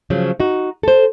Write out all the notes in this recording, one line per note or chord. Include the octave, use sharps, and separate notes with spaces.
C#3 F3 F#3
D#4 F#4
A4 C5